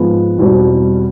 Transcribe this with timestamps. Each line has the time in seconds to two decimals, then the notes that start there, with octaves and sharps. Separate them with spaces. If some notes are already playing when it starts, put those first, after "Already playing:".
Already playing: G#2 F3 G#3 B3
0.38 E2 B2 G3 C4